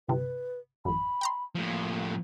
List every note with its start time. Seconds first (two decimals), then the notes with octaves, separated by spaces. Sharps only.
0.08 G1 C3 B4
0.85 A1 F#2 B5
1.21 G5 A#5 C6
1.55 A2 F3 A#3